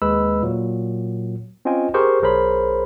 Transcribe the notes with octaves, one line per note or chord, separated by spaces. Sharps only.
D#2 G#3 B4 B5 E6
A#2 F#3
C4 C#4 F4 D#5 G5 G#5
G4 G#4 A#4 C5 C#6
B1 G#4 A#4 C5 C#5 B5